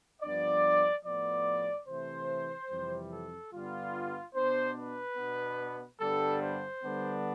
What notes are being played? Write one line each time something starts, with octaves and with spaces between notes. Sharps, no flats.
G2 F3 B3 D4 D5
A2 F3 B3 D5
C3 E3 A3 C5
F2 C3 E3 G3
A4
G2 D3 G3 B3 F4
B2 B3 D4 C5
B4
B2 B3 D4
G2 D3 G3 B3 D4 A4
C5
D3 G3 B3 D4